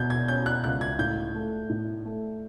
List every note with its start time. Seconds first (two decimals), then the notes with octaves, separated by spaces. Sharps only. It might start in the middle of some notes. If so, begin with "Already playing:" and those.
Already playing: B2 G6 G#6
0.10 G#6
0.28 C#4 G6
0.46 F#6
0.64 C#2 F#6
0.81 G#6
0.99 A2 G6
1.35 A3
1.69 A2
2.05 A3